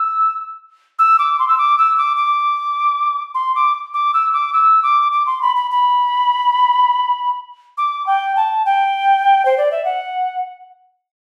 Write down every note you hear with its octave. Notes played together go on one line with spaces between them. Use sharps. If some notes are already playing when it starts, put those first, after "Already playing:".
Already playing: E6
E6
D6
C6
E6
D6
E6
D6
D6
C6
D6
D6
E6
D6
E6
D6
D6
C6
B5
B5
B5
D6
G5
A5
G5
C5
D5
E5
F#5